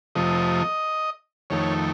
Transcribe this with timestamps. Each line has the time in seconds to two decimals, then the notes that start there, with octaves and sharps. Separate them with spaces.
0.15 F2 C3 F3 A3 D#5
1.50 F2 D#3 A3 C#5